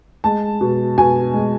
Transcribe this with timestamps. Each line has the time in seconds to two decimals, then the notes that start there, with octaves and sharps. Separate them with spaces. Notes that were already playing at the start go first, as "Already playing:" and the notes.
0.24 G#3 A5
0.61 B2
0.98 B2 G#5
1.34 G#3